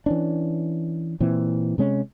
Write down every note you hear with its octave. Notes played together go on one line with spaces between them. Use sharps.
E3 C#4 D4
A#2 E3 C4
C3 G#3 C#4